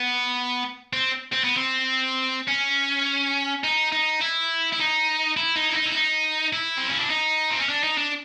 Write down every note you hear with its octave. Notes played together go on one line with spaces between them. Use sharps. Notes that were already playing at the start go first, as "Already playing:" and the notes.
Already playing: B3
C4
C4
B3
C4
C#4
D#4
D#4
E4
E4
D#4
E4
D#4
E4
D#4
E4
D#4
E4
C4
C#4
D4
D#4
C4
C#4
D4
D#4
D4